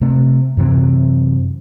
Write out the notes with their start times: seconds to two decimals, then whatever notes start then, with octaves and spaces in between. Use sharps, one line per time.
0.01 C3 A3 C4
0.57 F#2 C3 E3 C4